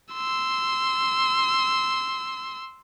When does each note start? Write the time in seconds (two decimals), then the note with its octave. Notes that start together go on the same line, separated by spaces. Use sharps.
0.14 C6 E6